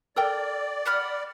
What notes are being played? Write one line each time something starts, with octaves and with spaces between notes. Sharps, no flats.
A4 A#4 D5 G5
F#5 B5 F6